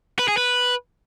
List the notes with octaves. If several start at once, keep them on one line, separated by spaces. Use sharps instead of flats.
B4
G#4
B4